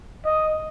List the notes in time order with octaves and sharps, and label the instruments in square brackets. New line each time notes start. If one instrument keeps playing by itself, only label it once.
[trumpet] D#5